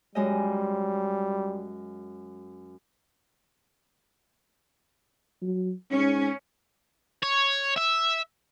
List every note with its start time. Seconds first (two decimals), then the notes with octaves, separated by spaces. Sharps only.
0.15 F#2 G3 G#3 D#5
5.42 F#3
5.91 G#2 C#4
7.23 C#5
7.78 E5